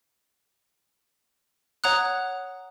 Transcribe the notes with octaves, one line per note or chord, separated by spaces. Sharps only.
C#5 F#5 A#5 D#6 F#6